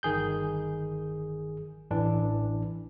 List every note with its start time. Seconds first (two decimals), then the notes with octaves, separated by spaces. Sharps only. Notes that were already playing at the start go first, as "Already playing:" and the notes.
0.03 G1 D#3 G#4 G6
1.91 A1 E3 D4